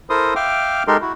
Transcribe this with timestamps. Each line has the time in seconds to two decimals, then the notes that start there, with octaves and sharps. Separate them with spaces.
0.10 E4 A4 A#4 C5 C6 D#6
0.36 E5 F5 G5 D6 F6
0.87 G#3 D#4 G4 A4 A#4 C6
1.01 E4 F#4